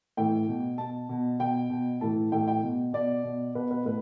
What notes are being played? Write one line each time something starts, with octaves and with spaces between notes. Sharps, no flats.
A2 E3 G5
B2
B2 A5
B2
B2 G5
B2
A2 E3 A5
A2 E3 G5
G5
B2
B2 D5
B2
B2 B4
B4
A2 B4